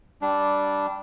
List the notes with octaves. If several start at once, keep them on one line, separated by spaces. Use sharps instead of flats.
G3 D4